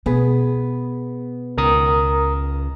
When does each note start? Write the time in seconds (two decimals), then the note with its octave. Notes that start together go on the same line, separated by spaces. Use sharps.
0.06 B2 B3 G#4 B4
1.58 C#2 A#4 A#5 D#6